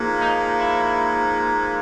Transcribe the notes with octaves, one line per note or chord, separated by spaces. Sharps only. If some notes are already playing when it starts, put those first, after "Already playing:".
Already playing: G#2 F3 A#3
D#4
E4